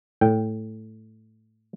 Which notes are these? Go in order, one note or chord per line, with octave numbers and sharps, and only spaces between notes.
A2 G5